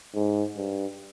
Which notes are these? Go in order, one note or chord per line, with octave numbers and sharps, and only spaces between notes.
G#2
G2